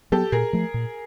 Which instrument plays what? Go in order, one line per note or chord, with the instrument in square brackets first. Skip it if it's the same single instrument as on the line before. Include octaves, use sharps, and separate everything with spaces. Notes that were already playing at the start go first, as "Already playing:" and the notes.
[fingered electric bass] F#3 B3 [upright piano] G4 A4
[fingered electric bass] A#2 [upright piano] G#4 A#4
[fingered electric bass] F3 A3
A#2